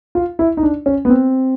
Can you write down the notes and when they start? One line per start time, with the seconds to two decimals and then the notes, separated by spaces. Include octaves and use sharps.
0.15 F4
0.39 E4
0.57 D#4
0.63 D4
0.86 C#4
1.05 B3
1.10 C4